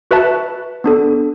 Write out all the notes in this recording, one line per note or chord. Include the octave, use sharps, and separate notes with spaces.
F#4 B4 E5 A5
B3 D4 A4